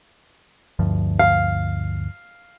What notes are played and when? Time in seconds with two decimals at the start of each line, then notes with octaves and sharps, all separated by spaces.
0.79 D2 G2 F3
1.19 F5